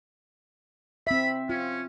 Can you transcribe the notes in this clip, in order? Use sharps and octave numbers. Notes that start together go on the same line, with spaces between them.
C4 E5 B5
C#4 F4